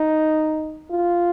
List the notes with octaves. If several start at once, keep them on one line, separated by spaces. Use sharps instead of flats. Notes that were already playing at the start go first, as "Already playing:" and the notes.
Already playing: D#4
F4